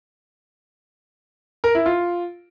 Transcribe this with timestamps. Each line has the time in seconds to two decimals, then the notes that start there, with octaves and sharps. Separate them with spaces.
1.64 A#4
1.75 E4
1.86 F4